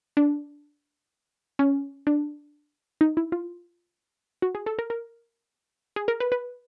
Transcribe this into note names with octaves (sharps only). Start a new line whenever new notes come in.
D4
C#4
D4
D#4
E4
F4
F#4
G#4
A4
A#4
A#4
G#4
A#4
B4
B4